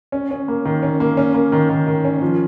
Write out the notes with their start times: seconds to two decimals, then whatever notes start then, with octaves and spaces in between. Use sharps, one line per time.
0.12 C#4
0.31 C#4
0.48 A#3
0.65 D#3
0.83 C#4
1.00 A#3
1.17 C#4
1.35 A#3
1.52 D#3
1.69 D#3
1.87 D#3
2.05 C#4
2.22 F3